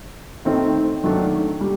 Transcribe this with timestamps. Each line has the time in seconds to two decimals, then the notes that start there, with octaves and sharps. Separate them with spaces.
0.45 D#3 A3 C4 D#4
1.04 D#3 F#3 A3 D4
1.61 G3